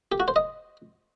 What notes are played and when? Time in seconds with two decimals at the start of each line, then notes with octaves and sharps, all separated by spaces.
0.12 G4
0.20 F#4
0.28 C5
0.36 D#5